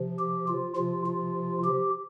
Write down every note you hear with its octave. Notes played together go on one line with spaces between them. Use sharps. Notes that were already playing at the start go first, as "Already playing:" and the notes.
Already playing: C3 F3
G4
F4
C3 F3 F4
F4
G4